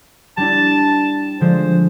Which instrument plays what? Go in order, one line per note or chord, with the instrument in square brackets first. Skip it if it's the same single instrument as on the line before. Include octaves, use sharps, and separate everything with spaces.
[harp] G3 D4 E4 [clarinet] A5
[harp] D3 F3 G#3 [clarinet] C5